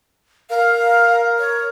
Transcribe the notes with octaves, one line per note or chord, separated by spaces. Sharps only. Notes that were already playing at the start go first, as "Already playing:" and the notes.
A#4 F5
C#5